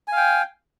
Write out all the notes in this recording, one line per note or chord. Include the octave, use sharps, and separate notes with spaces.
F5 G5 G#5